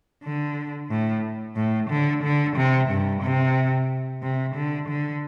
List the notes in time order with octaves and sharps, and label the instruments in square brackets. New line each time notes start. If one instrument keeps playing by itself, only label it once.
[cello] D3
A2
A2
D3
D3
C3
G2
C3
C3
D3
D3